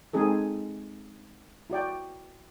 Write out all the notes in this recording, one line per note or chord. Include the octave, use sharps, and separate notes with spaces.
G#3 C4 D#4 G#4 A4
E4 F#4 D5 G5